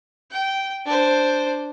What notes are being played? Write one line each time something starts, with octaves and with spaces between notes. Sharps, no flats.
G5
D4 C5